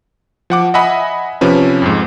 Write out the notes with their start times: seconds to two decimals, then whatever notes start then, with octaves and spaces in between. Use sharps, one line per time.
0.50 F3 F#5 D6
0.74 D#5 E5 F#5 G#5 B5 D#6
1.41 C3 F3 C#4 B4
1.82 F2 G#2